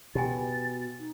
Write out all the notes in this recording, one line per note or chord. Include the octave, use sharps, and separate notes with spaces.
B2 G4 G5 G#5 A6
D#4